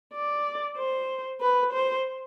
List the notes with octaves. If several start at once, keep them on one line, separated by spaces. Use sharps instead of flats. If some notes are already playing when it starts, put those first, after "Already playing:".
D5
C5
B4
C5